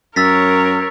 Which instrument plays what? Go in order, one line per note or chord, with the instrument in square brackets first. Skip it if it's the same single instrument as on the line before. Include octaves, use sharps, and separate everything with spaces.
[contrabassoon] F#2 [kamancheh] A#4 C#5 [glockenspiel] E6 A6 B6